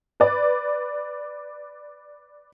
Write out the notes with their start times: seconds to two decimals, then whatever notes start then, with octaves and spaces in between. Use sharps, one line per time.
0.20 B4 D5